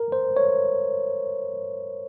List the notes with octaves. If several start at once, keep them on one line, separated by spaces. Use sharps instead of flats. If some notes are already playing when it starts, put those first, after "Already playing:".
Already playing: A#4
C5
C#5